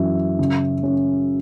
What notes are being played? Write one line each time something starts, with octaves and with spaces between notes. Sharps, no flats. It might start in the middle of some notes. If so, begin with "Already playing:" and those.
Already playing: F#2 E3 E5
C#3
C#4